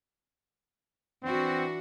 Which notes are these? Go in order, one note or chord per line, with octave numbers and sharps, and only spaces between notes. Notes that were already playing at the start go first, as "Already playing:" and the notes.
E3 C4 D4 F#4